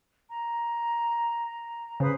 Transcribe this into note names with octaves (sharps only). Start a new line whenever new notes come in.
A#5
C#3 B4 C5 D#6